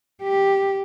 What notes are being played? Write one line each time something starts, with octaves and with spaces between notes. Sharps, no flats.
G4